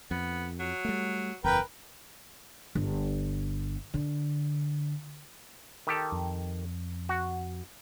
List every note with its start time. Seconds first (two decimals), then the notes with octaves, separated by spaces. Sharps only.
0.11 F2 B3
0.59 F#3
0.85 G3 A3
1.44 F#1 E2 A#4 B4 G5
2.75 G1
3.94 D3
5.87 D#3 G4 A4
6.12 F2
7.09 F#4